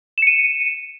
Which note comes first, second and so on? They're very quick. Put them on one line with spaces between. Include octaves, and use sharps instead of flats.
E7 C#7 D#7